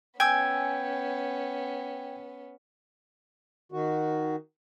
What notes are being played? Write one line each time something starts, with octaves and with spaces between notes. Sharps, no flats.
B3 C#4 G5 G#5 E6 G#6
D#3 F#4